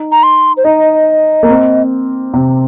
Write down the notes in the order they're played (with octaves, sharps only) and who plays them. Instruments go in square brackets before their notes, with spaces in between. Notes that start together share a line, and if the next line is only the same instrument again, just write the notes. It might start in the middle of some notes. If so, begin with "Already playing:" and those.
Already playing: [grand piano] D#4
[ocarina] A#5
C6
C5
[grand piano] D#4 [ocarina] D#5
[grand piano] A#3
C4
C3